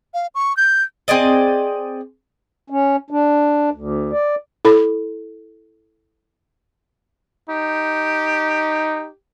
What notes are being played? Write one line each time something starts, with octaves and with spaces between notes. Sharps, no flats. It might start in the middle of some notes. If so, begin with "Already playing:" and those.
F5
C#6
G6
C4 G#4 D5 D#5
C#4
D4
D2
D5
E4 A4 B5
D#4 G4